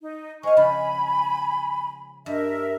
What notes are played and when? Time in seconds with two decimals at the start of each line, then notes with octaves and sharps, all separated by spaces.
0.01 D#4
0.43 G#3 C5 F5 G#5 C#6
0.57 C#3 F3 G#5 B5
2.26 G2 A#4 E5